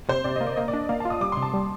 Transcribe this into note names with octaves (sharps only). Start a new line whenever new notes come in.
C3 C5
C3 D5
D#5
A#3
D5
A#3 D#5
D5
D4
A#3 F5
A5
F4 D#6
G3 D6
C6
C3
A5
G3